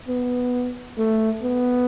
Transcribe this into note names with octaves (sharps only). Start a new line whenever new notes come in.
B3
A3
B3